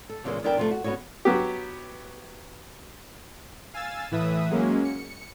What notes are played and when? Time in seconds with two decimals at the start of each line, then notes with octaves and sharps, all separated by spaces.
0.09 A4
0.24 A#2 C#3 E3 F3 G#3 A#3
0.43 E2 B3 D4 E4 A#4 G5
0.58 C3 F3 A3
0.71 F#4
0.84 B3 C#4 F#4 G#4 C#5
1.25 F#3 B3 G4
3.73 F5 G#5 E6 A6
4.11 A2 E3 B4 E5 D#6
4.50 F#3 G#3 A#3 C#4
4.85 C#7